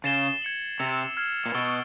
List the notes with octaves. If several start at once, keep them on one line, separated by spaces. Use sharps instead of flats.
C#3 A6 C7 E7 G7
G#6 C#7 F#7
C3 E6 A6 C#7 F7
F6 G#6 C7
A#2
B2 C#6 E6 A6 D7 G7